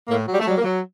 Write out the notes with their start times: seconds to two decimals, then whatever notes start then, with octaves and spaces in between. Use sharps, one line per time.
0.08 A2 A#3
0.27 F#3
0.33 G3
0.40 A3
0.45 F#3 G3
0.58 A#3
0.64 F#3